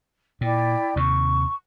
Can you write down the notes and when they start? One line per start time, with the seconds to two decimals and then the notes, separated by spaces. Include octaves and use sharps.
0.41 A#2 E4 D5 G5
0.96 D#2 C3 C#6